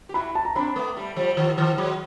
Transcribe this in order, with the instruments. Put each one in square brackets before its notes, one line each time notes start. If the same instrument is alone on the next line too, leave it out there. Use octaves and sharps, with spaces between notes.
[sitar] G4
[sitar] E4 F#4 [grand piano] B5
[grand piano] A5
A#5
[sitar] C4 D4 [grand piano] B5
[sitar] A3 B3
G3 A3
F3 G3
D#3 F3
D#3 F3
F#3 G#3